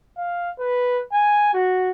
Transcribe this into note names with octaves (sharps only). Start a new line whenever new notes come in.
F5
B4
G#5
F#4